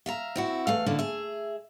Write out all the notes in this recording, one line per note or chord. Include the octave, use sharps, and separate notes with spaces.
E5 F5 A#5
C4 E4 F#4
E2 A3 F5
D2 D3 A#3 C#4 E4
G#4 E5